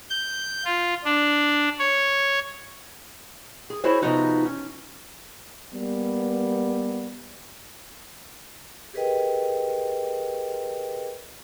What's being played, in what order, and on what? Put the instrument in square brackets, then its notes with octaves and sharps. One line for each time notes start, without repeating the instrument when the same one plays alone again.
[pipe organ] G6
F4
D4
C#5
[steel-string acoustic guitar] G#4
E4 F#4 G#4 C5 C#5
C3 F3 B3 D#4 F#4
C#4
[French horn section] G3 A#3 B3
[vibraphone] G4 G#4 A#4 B4 D#5 G5